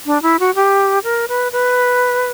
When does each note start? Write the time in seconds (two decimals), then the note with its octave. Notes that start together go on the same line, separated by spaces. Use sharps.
0.06 D4
0.22 E4
0.39 F#4
0.55 G4
1.04 A#4
1.28 B4
1.52 B4